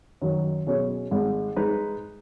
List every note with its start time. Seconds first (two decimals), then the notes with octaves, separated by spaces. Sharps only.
0.22 F#2 D#3 F#3
0.67 B2 F#3 C#4 G#4 C#5
1.11 G#1 G#2 G#3
1.56 G#3 D#4 B4